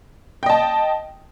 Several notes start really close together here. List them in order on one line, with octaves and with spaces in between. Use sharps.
G5 D#5 A5